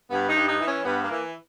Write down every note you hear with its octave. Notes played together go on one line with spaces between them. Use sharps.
G2 B3
D#4
G2
D#4
E3
C#4
G2 B3
A#3
E3